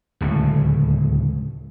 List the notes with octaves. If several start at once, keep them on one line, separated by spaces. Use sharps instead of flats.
D1 C#2 A2